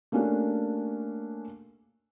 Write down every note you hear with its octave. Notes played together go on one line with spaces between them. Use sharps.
A3 A#3 C#4 D4 F#4 G4